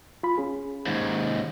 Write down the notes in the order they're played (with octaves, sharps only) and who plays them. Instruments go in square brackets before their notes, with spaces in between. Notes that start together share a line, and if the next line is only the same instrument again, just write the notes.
[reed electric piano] F4 B5
C#4 G#4
[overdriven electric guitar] D#2 G#2